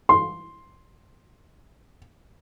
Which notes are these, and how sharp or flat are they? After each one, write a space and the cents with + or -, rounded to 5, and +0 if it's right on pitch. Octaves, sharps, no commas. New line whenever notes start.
C6 +5